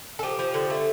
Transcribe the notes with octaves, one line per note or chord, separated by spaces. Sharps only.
A4
F3 G4
F3
D3
A3